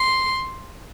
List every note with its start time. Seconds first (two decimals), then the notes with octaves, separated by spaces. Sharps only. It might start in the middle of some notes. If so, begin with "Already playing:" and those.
Already playing: C6